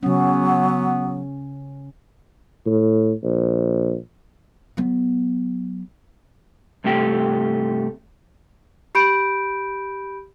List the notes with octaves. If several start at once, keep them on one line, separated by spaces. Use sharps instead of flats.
C#3 F#3 B3 C#4
A2
A#1
F#3 B3
G2 C3 A3 G4 G5
G4 B5 G6 D7